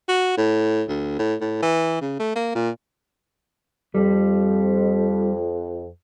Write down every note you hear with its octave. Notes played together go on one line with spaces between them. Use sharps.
F#4
A2
D2
A2
A2
E3
C#3
A3
A#3
A#2
F2 G3